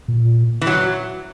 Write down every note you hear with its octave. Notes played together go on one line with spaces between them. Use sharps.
A#2
E3
F#3